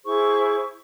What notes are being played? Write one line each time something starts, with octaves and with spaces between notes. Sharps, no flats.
E4 G#4 C5 C#6